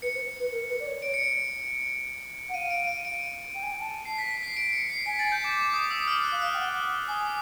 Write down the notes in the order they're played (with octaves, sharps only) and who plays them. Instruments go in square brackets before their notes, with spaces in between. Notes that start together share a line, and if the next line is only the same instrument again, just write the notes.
[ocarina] B4 [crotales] C#7
[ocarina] C5
B4
A#4
B4
D5
C#5
[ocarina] C#5 [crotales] D7
[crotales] C#7
D7
[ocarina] F#5
[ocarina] F5 [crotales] D#7
[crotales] D7
D#7
D7
[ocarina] G5
G#5
G5
A5
[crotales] C7
B6
B6
C7
D7
C#7
C7
[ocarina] G#5 [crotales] B6
[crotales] A6
G6
D6
D6
D#6
E6
F6
F#6
[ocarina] F5
[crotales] F6
[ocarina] G5
F#5
[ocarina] G#5 [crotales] D#6